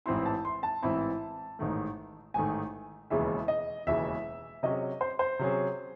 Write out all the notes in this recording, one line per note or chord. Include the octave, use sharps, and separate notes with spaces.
A1 G#2 E3 C4 E4 C6
A5
C6
A5
A1 G#2 E3 C4 E4
A1 G#2 D#3 A3
A1 G#2 D#3 A3 G#5
E1 D#2 C#3 E3 G#3 E5
D#5
E1 D#2 C#3 E3 G#3 E5
C3 F#3 C#4 G#4 D#5
C5
C5
C3 F#3 C#4 G#4